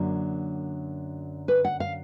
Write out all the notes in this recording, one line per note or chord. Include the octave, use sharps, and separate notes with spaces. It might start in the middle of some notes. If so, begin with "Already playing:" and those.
Already playing: F#2 D3 F#3 A#3
B4
F#5
F5